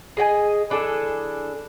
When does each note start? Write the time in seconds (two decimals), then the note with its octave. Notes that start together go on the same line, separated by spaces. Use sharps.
0.17 G#4 D#5 G5 G#5
0.70 E3 D4 G#4 A4